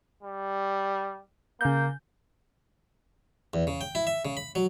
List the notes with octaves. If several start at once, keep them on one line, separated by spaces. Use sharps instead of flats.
G3
C#3 A#3 G6
E2
C#3
G5
E4
E5
C#3
B5
F#3